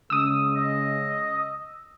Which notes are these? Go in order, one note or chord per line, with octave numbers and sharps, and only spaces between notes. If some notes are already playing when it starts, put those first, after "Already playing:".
C#3 G#3 D#6 E6
D#5